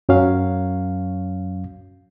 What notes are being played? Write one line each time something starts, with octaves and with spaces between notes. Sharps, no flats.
F#2 F#3 C#4 F5